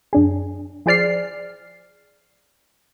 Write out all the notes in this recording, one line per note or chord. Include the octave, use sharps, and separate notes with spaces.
F#2 D4 G#4
F3 G#4 C5 D5 F6 C7